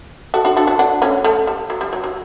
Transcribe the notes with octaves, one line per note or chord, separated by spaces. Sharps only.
F#4 A4
D4 F#4
F#4 A4
F#4 A4
D4 F#4
A3 C#4
A3
G3
F#3
G3
F#3
F#3